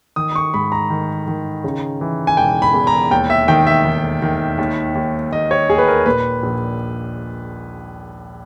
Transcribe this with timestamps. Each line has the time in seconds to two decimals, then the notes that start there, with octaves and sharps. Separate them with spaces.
0.16 D#3 D#6
0.35 C#6
0.54 G#2 B5
0.72 A#5
0.90 D#3
1.28 D#3
1.64 C#3
2.01 E3
2.27 G#5
2.37 E1 G5
2.62 B5
2.74 E2
2.87 A#5
3.11 D#2 G5
3.30 E5
3.48 D#3 G5
3.67 E5
3.85 D#3
4.22 D#3
4.58 D#2
4.95 D#2
5.32 D#2 D#5
5.51 C#5
5.69 D#2 G#4
5.78 B4
5.88 A#4
6.06 A#2 B4
6.43 A#1